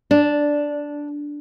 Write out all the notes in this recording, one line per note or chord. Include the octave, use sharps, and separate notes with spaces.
D4